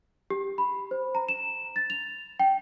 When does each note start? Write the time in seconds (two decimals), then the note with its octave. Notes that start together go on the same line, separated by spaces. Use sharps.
0.30 G4
0.58 B5
0.91 C5
1.15 A#5
1.29 E7
1.76 A6
1.90 F7
2.40 G5